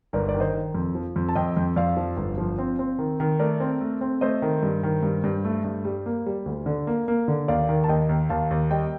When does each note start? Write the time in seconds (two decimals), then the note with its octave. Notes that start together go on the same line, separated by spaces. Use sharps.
0.13 G1 A#4 D5
0.29 D5
0.34 D#3
0.40 C5 D#5
0.54 D#3
0.74 F2
0.95 F3
1.16 F2
1.29 A5
1.35 F2 D#5 G5
1.57 F2
1.76 F2 D5 F5
1.97 F3
2.17 G1
2.38 F3
2.58 C4
2.79 C4
2.99 D#3
3.20 D#3
3.39 A3 A#4 D5
3.60 C4
3.81 A3
4.01 C4
4.21 A3 C5 D#5
4.42 D#3
4.63 G2
4.83 D#3
5.03 G2
5.24 G2
5.45 A3
5.64 G2
5.85 G3
6.06 A#3
6.26 G3
6.46 D2
6.66 D3
6.87 A#3
7.08 A#3
7.28 D3
7.48 D#2 D5 F5
7.69 D#3
7.84 A5
7.88 D#2 D#5 G5
8.09 D#2
8.29 D#2 F5 A5
8.51 D#2
8.70 G3 D#5 G5